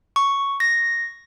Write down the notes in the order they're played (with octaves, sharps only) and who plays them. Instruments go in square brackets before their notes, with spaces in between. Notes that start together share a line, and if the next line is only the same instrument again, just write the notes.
[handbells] C#6
A#6